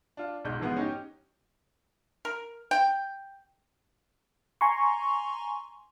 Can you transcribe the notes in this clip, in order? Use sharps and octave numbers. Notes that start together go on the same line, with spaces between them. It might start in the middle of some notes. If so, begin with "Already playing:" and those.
D4 F4
B1 G#2 G6
G#2 E3 F3 G#3 B3
C#4 D#4 G4
A#4
G5
G#5 A#5 C6 C#6